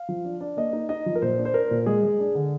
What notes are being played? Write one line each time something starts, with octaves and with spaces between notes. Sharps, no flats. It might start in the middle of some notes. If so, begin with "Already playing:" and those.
Already playing: F5
F3
D4
D4
A#3 D#5
D#4
D#4 D#5
F3
A#4
A#2 C5
D4
C5
D4 A#4
A#2
G#3 G#4
G#3
D4
D3